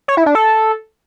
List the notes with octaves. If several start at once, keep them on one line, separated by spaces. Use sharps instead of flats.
C#5
E4
D4
A4